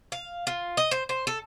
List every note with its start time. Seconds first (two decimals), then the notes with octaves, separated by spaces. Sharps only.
0.12 F5
0.47 F4
0.77 D#5
0.91 C5
1.09 C5
1.27 A4